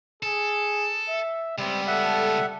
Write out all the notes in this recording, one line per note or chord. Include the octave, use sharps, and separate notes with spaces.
G#4 A4
E5
C#2 G3 B3 C4
A4 E5 F#5